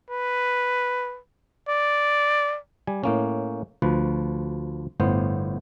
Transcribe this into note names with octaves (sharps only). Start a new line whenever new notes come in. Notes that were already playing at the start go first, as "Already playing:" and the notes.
B4
D5
G3 G#5
A2 A#3 C#4
D2 F3 B4
G1 A2 B3 C5